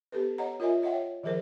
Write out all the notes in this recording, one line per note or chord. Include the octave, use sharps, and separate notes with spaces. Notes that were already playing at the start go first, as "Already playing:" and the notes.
B3 G4 A4 B4
C#5 D#5 F#5 A#5
F4 A#4 C#5 D#5 E5 G#5
C#5 D#5 E5 F#5 G5
C#5
D#3 F3 G#4 A#4 C5